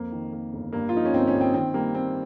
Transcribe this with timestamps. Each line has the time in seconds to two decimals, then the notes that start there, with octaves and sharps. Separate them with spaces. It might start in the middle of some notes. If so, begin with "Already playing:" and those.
Already playing: F2 A#3
0.12 D#3
0.33 A#3
0.53 G1
0.72 G2 A#3
0.89 F4
0.93 F3 D#4
1.05 C#4
1.13 G1 C4
1.27 C#4
1.34 G1
1.41 C4
1.54 D#3 C4
1.74 G3 A#3
1.95 A#3 C4